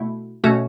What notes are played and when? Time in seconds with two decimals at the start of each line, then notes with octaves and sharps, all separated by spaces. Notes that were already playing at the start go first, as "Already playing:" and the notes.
Already playing: B2 A3 E4
0.44 B2 A3 C#4 F#4